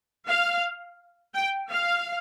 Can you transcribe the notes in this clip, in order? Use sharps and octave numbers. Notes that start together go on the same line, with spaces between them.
F5
G5
F5